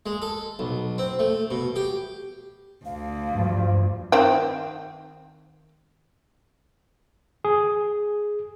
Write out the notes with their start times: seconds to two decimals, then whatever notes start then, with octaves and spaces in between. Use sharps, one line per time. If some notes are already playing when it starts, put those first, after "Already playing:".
0.06 G#3
0.22 A4
0.59 B1
0.98 C4
1.19 A3
1.51 B2
1.76 G4
2.85 D2 F5
3.31 G2 F3
4.12 D#3 C4 G5
7.45 G#4